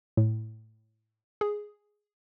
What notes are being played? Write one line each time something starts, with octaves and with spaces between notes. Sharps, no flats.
A2
G#4